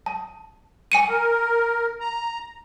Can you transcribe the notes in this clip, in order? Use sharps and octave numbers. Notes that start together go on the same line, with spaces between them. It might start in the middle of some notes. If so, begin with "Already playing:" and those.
A5
G#5 C#7 D#7
A#4
A#5